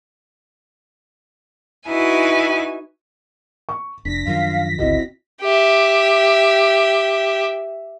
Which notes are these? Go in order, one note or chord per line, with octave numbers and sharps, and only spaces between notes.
D#4 E4 F#4 B4 G#5
C#6
F1 D4 A#6 B6
F#2 D#3 F3 F5
G1 C#2 C4 E4 F#4 D#5
G4 E5